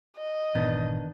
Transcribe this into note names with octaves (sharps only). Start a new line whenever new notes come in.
D#5
G1 A#2 D#3 E3 B3 D4